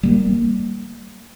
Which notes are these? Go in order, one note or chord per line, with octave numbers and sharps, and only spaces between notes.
G3 A#3